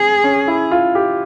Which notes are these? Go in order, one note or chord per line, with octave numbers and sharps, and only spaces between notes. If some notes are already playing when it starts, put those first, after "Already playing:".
Already playing: C4 G#4
C#4
E4
F4
G4